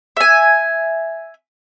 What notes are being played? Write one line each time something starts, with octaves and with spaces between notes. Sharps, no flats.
E5 G#5